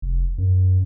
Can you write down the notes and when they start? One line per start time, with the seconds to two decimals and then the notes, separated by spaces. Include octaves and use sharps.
0.02 F1
0.38 F#2